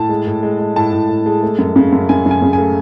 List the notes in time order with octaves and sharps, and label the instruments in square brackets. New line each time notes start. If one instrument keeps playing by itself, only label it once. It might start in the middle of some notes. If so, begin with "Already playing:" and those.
Already playing: [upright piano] A2 A5
G#3
A2
G#3
G#3
A2 A5
A2
A2
G#3
A3
F#2
C#3
F#2
F#2 G#5
F#2
G#5
C#3
G#5
A3